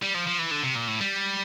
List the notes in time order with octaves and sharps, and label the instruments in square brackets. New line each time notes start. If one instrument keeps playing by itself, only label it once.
[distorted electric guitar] G3
F3
F3
E3
D3
C3
A#2
A2
G3